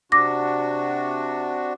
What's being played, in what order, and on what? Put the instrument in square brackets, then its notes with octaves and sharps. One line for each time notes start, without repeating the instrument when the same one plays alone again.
[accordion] C3 D4 F#4 [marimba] D6 A#6